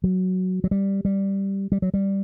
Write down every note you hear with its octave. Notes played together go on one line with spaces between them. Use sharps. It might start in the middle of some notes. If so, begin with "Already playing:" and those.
F#3
F#3
G3
G3
G3
F#3
G3